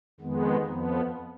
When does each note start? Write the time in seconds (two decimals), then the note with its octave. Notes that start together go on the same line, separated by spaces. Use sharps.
0.20 F2 D#3 G#3 B3
0.65 F2 F3 B3